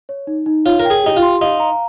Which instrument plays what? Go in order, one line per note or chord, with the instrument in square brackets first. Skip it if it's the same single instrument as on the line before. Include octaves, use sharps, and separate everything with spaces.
[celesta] C#5
D#4
D#4
[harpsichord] F4 [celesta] C#5
[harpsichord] A#4
[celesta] G5
[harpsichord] G#4
[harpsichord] D#4 [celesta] G4
[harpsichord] F4
[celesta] C6
[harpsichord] D#4 [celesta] F5
[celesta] A#5